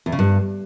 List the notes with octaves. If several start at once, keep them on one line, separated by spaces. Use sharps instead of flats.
E2
C#3
G2